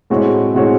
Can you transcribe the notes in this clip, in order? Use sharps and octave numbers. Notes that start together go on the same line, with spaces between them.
A2 G#3 C4 F#4 C#5
A2 G#3 C4 F#4 C#5